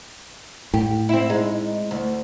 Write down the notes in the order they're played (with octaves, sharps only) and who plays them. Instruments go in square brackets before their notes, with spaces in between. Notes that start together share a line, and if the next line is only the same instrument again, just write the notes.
[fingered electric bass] A2 [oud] G4
[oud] C4 E4
G#3 D#4
D2